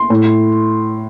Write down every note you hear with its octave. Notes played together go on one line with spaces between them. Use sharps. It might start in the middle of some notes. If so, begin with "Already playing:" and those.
Already playing: C6
A2